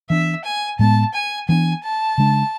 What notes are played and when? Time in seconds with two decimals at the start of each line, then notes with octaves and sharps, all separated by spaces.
0.10 E3 B3 D4 E5
0.44 G#5
0.79 A2 G#3 B3 A5
1.14 G#5
1.48 E3 B3 D4 G#5
1.83 A5
2.18 C#3 G#3 D4